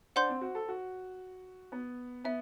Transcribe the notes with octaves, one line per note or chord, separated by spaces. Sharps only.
D4 C5 F#5 C6 G6
C4
F#4
A4
F#4
B3
B3 E5